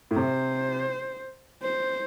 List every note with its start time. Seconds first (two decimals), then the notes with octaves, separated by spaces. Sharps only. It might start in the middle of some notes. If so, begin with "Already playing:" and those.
0.11 A2
0.16 C3 C5
1.63 C5